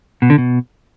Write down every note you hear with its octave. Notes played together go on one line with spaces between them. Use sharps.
B2
D3
B2